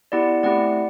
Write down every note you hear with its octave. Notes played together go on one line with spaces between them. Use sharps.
B3 E4 G4 D5 F#5
A3 C4 E4 G4 D5 F#5